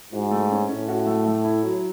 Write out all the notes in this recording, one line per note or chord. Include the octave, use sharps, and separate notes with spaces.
G#2 F#4
A3
C#4
A2 C#4
F#4
A3
A3
E4
F#3